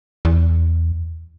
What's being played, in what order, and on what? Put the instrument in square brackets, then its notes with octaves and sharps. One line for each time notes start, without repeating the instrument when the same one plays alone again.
[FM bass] E2